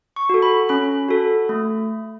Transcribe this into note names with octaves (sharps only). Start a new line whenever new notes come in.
C#6
F#4 A4
B5
C#4 B5
F#4 A4
A3